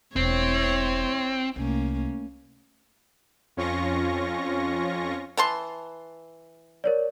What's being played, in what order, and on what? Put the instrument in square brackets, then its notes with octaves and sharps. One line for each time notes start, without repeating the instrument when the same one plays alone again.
[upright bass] E1 [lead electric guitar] C4 [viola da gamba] E4 C#5
[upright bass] C2 [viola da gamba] A3 A#3 C#4
[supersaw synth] F2 C#4 F4 C#6 A#6
[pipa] E3 A5 C6
[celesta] A#4 C#5 D5